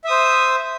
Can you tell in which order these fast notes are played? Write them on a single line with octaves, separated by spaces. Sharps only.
E5 D#6 C5